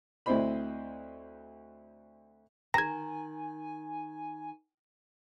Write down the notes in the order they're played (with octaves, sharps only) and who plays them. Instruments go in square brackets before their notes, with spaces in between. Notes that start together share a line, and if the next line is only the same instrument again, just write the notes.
[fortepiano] D2 C4 E4 C5 D#5 B5
[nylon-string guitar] D#3 [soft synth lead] G#5 [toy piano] A#5 [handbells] G#6 A#6